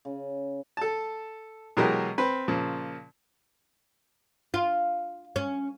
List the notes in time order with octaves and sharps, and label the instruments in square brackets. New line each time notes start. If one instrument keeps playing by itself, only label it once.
[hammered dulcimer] C#3
[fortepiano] A4 A5
B2 E3 F#3 G#3 G4 A#4
C4 B4
A#2 C#3 F3
[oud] F4
C#4